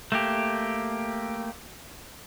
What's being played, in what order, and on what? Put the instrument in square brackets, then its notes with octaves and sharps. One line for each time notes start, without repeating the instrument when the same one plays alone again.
[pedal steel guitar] A3 A#3 G4